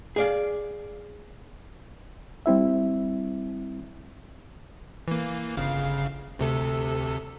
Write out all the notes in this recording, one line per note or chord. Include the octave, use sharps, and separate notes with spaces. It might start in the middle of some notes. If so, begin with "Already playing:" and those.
G#4 D5 F5
G3 C4 E4 E5
E3 A#3
G1 C#3 F5
D2 C3 A4